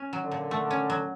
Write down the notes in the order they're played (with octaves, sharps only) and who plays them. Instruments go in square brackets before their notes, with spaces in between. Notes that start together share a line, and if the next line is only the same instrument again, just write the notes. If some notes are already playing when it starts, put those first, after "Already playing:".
Already playing: [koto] C#4
F#3
[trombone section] D3
[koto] A#2
A3
C#4
F#3